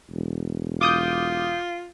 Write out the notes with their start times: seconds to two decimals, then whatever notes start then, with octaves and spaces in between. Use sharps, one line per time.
0.11 E1
0.81 F4 D6 D#6 G6